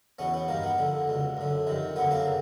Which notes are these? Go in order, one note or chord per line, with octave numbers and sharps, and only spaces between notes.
E2 B2 B3 C#4
B3
G2 D#3 A#3
B3
F2 D3
C#2 B2
F#2 D3
F2 C3 D#3
F#2 D3 B3
A#3 C4
C#3